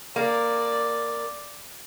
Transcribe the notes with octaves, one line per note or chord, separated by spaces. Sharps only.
A#3 D5